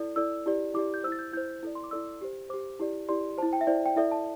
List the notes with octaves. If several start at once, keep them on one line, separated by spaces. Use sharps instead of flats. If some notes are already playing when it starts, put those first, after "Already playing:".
Already playing: E4 A4 D5
E4 A4 D5 E6
E4 G4 D5
E4 G4 D5 D6
G6
E4 C5 E6 A6
G6
E4 C5 G6
E4 A4 D5
C6
D6
E4 A4 D5 E6
G4 C5
G4 C5 D6
E4 G4 D5
E4 G4 D5 C6
E4 C5 A5
G5
E5
E4 C5 D5
G5
E4 A4 D5 E5
A5